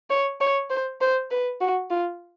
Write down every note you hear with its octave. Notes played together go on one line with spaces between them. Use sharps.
C#5
C#5
C5
C5
B4
F#4
F4